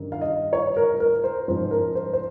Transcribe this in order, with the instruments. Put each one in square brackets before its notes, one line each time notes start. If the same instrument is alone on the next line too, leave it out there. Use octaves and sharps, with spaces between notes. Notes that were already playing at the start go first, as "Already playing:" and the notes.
Already playing: [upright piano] G2 D#3 G3 C#4
F5
D#5
C#5
A#4
A#4
C5
G#2 F3 G#3 C#4 C5
A#4
C5
C5